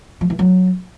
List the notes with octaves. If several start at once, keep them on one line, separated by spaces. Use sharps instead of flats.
F3
E3
F#3